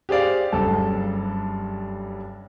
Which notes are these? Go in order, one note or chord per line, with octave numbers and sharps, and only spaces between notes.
G4 G#4 C5 D5 F5
F#1 G2 A4